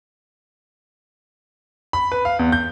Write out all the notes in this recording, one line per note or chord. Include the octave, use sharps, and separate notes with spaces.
B5
B4
F5
E2
G6